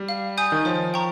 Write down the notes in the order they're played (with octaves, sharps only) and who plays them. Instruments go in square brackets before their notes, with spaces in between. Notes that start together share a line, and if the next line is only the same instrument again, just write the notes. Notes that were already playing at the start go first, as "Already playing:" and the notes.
Already playing: [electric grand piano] G3
[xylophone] F5
G#5 D#6 G6
[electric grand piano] D#3
[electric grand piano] F3 [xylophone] C#5
[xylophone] G5 A#5 C#6